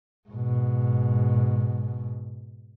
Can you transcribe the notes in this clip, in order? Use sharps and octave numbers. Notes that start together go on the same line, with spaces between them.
G#2 B2